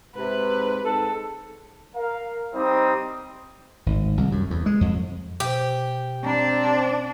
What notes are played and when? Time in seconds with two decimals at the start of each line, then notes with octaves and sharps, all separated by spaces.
0.15 G#2 C3 B4
0.83 G#2 A4
1.95 A#4 F5
2.53 G3 C4 D#4 G4 C5 D#6
3.86 G#1
4.17 C2
4.32 F#2
4.50 E2
4.66 G#3
4.81 F2
5.40 B2 G4 C5
6.25 C4 D4 A#5 B5